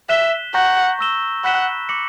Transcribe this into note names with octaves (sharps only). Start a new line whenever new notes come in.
E5 F#6 B6 E7 G7
F#5 A#5 C#6 G6 A#6
C#6 E6 A#6 E7 G7
F#5 B5 F#6 B6 E7 G7
D6 A#6 C#7 F#7